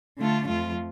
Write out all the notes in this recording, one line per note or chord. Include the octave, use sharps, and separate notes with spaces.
D3 A3 D4 F4
F2 F3 A3 F4